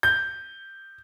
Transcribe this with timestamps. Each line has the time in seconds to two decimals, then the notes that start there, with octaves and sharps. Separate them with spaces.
0.03 G6